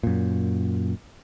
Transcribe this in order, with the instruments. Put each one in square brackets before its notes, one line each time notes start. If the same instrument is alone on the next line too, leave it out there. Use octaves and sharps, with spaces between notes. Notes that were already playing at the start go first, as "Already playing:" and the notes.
[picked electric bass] F#2 A#2